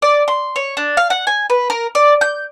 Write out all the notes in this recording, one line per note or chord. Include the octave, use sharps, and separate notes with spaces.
D5
C6
C#5
D4
F5
F#5
G#5
B4
A#4
D5
G6